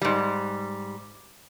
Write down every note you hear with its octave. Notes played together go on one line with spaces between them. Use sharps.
G#2 G3